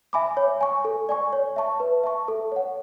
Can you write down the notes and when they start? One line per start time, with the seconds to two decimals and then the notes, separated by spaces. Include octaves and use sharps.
0.13 E5 G#5 B5 D6
0.37 C#5
0.61 G#5 C#6
0.85 A4
1.09 D5 G#5 C#6
1.33 C#5
1.56 E5 A5 C#6
1.80 B4
2.04 E5 A5 C#6
2.28 A4
2.52 C#5 F#5